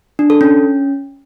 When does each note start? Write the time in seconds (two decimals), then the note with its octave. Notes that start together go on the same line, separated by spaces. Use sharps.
0.19 D4
0.30 A4
0.41 C#4